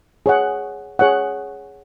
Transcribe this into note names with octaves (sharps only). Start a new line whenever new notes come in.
G#4 C#5 F#5
G#4 C#5 F#5